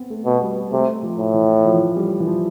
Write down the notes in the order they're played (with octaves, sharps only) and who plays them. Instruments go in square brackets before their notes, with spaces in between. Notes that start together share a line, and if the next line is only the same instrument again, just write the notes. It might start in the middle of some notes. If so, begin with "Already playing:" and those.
Already playing: [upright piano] B3 C4
A3
[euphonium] B2
[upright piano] G3
[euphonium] C3 [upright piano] A3
[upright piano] F3
[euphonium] A2
[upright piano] E3
F3
E3
F3
G3
E3
F3